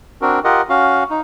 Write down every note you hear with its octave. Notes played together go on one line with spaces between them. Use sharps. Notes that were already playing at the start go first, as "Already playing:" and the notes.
C4 D4 F#4 A#4
F4 G4 A#4 D#5 F#5
C#4 F#4 F5
D#4